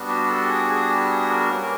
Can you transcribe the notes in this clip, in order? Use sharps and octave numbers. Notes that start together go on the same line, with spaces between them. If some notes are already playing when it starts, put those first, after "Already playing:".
Already playing: G3 B3 D4 F#4
G4
A4
G#4
G#4
G4
G#4
A#4
G3 A#3 C#4